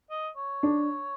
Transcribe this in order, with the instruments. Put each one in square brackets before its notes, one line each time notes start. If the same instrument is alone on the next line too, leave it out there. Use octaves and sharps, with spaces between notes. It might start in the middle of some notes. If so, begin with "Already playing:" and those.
[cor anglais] D#5
C#5
[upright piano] D4